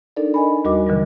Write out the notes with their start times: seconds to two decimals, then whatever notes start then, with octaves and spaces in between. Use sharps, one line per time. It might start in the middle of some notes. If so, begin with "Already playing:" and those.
0.17 D4 D#4 A4 A#4 D5
0.34 D#5 G#5 B5
0.64 D#2 G3 F#4 A#4 D#5 D6
0.87 B2 D3 E3 F#3 G3